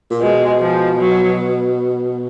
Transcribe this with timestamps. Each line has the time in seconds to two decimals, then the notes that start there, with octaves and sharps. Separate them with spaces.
0.10 A#2
0.21 B2 G#3
0.61 F3
1.00 F#3